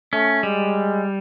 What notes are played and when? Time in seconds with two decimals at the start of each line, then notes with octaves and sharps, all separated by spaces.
0.13 A3 C#4
0.43 G3 G#3